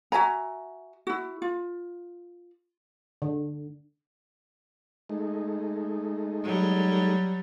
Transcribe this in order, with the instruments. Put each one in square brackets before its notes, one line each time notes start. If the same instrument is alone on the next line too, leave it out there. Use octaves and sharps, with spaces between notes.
[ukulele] F#4 E5 G#5 A#5
E4 F#4
F4
[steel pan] D3
[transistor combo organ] G#3 A3 D#4
[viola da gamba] F#3 G3